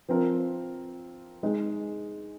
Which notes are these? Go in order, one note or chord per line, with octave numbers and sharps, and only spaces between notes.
F3 C4 F4 A#4
G#3 D#4 G#4